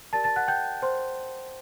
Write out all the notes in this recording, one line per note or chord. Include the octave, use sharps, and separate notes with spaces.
G4 A#4 D5 A5 A6
A5 A6
F#5 F#6
G5 G6
C5 C6